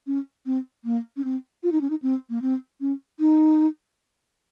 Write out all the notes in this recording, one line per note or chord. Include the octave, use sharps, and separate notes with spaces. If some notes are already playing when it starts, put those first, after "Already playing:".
C#4
C4
A#3
C#4
C4
F4
D#4
C#4
D#4
C4
A#3
C4
C#4
D#4